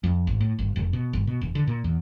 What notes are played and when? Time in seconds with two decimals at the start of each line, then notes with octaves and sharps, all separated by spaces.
0.04 F2
0.27 G#1
0.40 A2
0.59 G1
0.76 F1
0.93 B2
1.13 G1
1.27 B2
1.41 E1
1.55 D3
1.67 A#2
1.84 E2